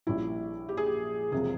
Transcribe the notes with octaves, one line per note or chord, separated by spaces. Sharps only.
A#1 A#2 G3 C#4 E4
G4
G#4
G4
E1 C3 F3 G#4